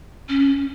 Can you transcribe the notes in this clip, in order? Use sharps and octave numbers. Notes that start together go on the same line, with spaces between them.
C#4